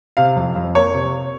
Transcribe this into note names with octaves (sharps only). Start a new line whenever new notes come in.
C3 F5
F2
F2
A#3 C#5
C3